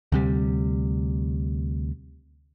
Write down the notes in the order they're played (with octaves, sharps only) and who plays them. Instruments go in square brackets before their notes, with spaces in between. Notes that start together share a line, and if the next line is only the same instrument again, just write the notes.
[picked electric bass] D2 C3 G3